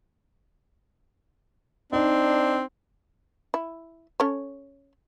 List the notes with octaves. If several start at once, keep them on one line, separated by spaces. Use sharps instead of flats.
C4 D4 D#4
E4
C#4 A4 C#5